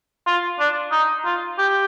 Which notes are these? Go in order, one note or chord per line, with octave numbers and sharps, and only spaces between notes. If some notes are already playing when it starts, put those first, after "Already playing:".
F4
D4
D#4
F4
G4